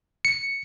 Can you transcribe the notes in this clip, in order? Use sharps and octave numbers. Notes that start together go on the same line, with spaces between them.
C#7